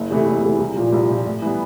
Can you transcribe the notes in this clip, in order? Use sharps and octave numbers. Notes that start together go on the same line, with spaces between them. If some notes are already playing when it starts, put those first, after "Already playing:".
Already playing: F#1
E2 C3 E3 A3
F#1
E2 C3 E3 A3
C2
A#2 F3
C2
A#2 F3
A2
E3 G3 B3